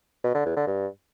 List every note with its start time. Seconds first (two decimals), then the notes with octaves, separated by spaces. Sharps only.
0.24 B2
0.35 D3
0.46 E2
0.56 D3
0.67 G2